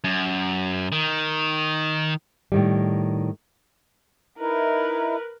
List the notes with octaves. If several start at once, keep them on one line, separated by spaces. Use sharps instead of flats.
F#2
D#3
A2 D#3 G3
D#4 E4 A#4 B4